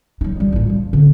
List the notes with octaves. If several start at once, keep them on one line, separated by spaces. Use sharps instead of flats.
F#3 D#4
G3 G#3
A1 D4
F3
D3 C4